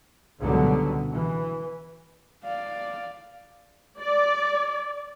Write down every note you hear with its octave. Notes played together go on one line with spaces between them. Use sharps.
C#2 B2 D3 F#3 G3
E3
D5 F5
D5